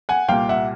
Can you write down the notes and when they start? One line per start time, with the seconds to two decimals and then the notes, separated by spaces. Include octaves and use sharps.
0.09 F#5 G#5
0.28 C2 A#2 G3 A#3 F5 G5
0.49 E5 F#5